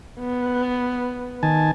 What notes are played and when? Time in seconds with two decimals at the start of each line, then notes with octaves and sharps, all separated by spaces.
0.20 B3
1.43 D#3 G#5 A5